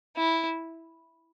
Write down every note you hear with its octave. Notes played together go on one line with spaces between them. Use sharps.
E4